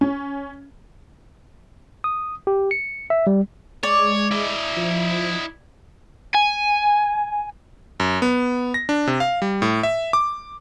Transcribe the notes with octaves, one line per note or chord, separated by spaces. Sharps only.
C#4
D#6
G4
C#7
E5
G3
G#3 C#5 D5
E4 D#5
F3
G#5
F#2
B3
A#6
D4
C3
F5
G3
A2
E5
D6